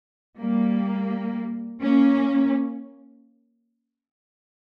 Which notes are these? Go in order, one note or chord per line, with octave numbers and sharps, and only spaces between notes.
G3 A#3
A#3 C#4